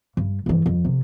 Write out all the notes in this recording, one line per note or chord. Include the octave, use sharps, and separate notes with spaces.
G2
G2 E3
F2
C3